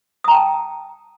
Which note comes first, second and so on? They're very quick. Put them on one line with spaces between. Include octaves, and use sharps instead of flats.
D#6 A#5 G5 A5